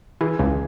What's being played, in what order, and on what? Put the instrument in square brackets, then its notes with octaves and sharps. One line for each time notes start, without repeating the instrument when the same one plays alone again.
[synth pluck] E3 [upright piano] G#4
[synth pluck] C#2